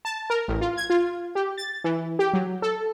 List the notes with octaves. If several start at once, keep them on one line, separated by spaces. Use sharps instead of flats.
A5
A#4
A1
F4
G#6
F4
G4
A6
E3
G4
F#3
A4